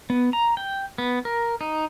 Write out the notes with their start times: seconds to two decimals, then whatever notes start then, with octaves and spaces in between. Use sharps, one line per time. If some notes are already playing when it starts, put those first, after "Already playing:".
0.10 B3
0.33 A#5
0.57 G5
0.98 B3
1.25 A#4
1.61 D#4